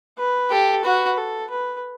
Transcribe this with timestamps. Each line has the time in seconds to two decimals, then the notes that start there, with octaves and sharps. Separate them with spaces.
0.19 B4
0.51 G4 A4
0.84 F#4 B4
1.17 A4
1.50 B4